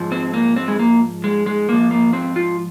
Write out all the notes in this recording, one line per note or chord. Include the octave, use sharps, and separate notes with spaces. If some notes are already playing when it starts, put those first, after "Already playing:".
Already playing: G#2 F3
C4
A#3
C4
G#3
A#3
G#3
G#3
G#2 F3 A#3
A#3
C4
F4